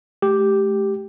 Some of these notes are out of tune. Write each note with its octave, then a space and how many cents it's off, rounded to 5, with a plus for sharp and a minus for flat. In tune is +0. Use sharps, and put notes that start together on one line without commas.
A3 -40 G4 +0